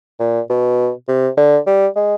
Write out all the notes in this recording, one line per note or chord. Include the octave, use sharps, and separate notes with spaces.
A#2
B2
C3
D3
G3
G#3